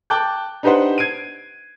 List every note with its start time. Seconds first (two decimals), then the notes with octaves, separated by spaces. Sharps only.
0.10 G5 A5 D6 F#6 G6
0.63 D4 D#4 G4 B4 C5 F#5
0.98 G#6 C7 D7 D#7